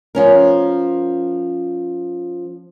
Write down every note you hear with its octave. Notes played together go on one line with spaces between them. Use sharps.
F3 C#4 A#4